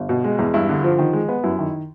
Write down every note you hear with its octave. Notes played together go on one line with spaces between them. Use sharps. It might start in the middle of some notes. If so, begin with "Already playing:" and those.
Already playing: G1
B2
G#3
E2
G2 E4
D3
F3
D#3
G#3
B3
F#2 E4
D#3